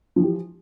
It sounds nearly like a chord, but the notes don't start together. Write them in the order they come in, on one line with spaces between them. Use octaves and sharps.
F3 E3 G4